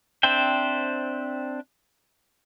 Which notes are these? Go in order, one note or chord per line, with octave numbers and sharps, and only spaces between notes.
C4 D4 C5 E5 G5